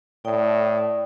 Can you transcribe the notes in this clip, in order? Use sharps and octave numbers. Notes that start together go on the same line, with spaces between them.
A2 D5 G5 D#6